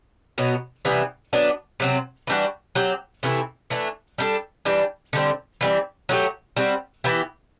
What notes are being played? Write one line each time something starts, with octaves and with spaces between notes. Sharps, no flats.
B2 F#3 B3
C3 E3 G3 B3
F#3 B3 D4
C3 F#3 C4
E3 G3 D4 F#4
F#3 C4 G4
C3 E3 A3 E4
E3 A3 D4
G3 D4 A4
E3 G3 D4
D3 G3 C4
E3 G3 C4
F#3 A3 D4 G4
G3 C4 F#4
E3 B3 E4 G4